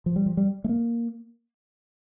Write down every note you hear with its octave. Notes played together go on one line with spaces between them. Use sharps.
F3
G3
F3
G3
A3
A#3